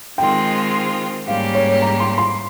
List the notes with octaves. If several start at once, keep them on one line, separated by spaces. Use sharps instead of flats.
D#3 G#3 C4 F4 G5
G#2 G3 A#3 C#4 G4 F5
C#5
A#5
C6
C6